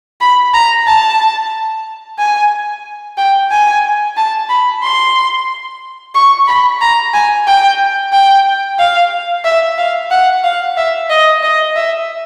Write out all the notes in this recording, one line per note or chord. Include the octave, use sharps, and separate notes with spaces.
B5
A#5
A5
G#5
G5
G#5
A5
B5
C6
C#6
B5
A#5
G#5
G5
G5
F5
E5
F5
F#5
F5
E5
D#5
D#5
E5